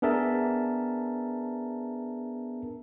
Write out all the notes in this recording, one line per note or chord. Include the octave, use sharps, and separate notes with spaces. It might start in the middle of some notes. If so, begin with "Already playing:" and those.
B3 D4 G#4 A#4 E5 A5